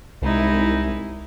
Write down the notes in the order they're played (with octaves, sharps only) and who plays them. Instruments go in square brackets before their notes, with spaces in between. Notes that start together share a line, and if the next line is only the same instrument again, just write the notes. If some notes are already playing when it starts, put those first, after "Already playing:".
[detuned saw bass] C2 [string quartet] G#3 D#4 E4